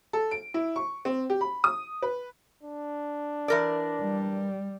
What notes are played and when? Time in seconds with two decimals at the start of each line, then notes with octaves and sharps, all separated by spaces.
0.13 A4
0.31 D7
0.54 E4
0.76 C#6
1.05 C4
1.30 G4
1.41 B5
1.64 D#6
2.02 B4
2.63 D4
3.48 E3 A#4 D5
4.02 G3